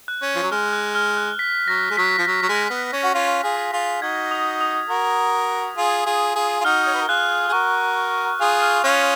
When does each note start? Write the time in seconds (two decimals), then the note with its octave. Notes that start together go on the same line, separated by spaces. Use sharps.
0.08 F#6
0.22 C#4
0.36 F3
0.43 F#3
0.51 G#3 F6
0.73 F#6
0.95 F6
1.17 F#6
1.39 B6
1.68 F#3 A#6
1.90 G#3
1.97 F#3 B6
2.18 F3
2.27 F#3
2.42 F#3
2.49 G#3
2.70 B3
2.93 C#4
3.04 F#4
3.14 C#4 F4
3.44 F4 G#4
3.73 F4 G#4
4.02 D#4 F#4 G#6
4.31 D#6
4.61 D#6
4.89 F#4 A#4
5.77 F4 G#4
6.06 F4 G#4
6.36 F4 G#4
6.61 F4
6.64 D#4 F#4 F6
6.87 C#5
6.94 B4
7.01 A#4
7.09 F4 G#4 F#6
7.48 G#4
7.52 F#4 A#4 C#6
8.40 F4 G#4 D#6
8.62 F6
8.84 C#4 F4 F#6